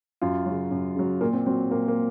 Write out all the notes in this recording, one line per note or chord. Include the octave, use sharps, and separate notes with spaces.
F#2 F4
C#3 F#3
F#2
C#3 F#3
A#2 A#3
C4
F#3 C4
A#2 A#3
A#3